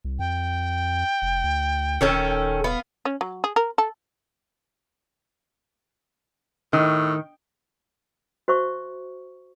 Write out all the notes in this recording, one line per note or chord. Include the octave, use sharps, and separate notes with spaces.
C2
F2 G5
F1
D2
D#1 D#3 C#4 A4
B3 F5
C#4
F#3
G#4
A#4
A4
A2 D#3
F#4 C5 E5 C#6